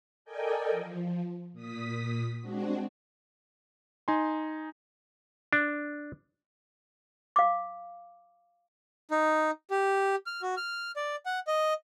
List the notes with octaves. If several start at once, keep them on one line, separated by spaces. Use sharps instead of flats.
A4 A#4 D5 D#5 G5 G#5
F3
A#2 D#6 B6
G#3 C4 D4 F#4
D#4 G#5 C6
D4
F5 D6
D#4
G4
F6
F#4
F6
D5
F#5
D#5